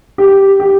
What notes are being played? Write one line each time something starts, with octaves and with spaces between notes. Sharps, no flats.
G4
G4